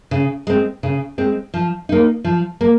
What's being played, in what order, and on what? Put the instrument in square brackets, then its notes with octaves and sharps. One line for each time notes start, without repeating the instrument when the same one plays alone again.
[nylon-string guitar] C#3
G#3 C4
C#3
G#3 C4
F3
A#3 D#4
F3
A#3